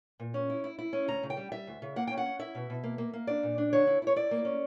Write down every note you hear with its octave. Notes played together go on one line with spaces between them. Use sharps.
A#2
C#4
E4
E4
E4
C#4
D2 A#5
C#3
G5
G3
G3 E5
D2
C#3
A#3 F#5
C#4 G5
F#5
C#4
E4 E5
B2
B2
A#3
A#3
A#3
D4 D5
A#2
D4
D3 C#5
E4
E4
C#5
E4 D5
A#3
C#4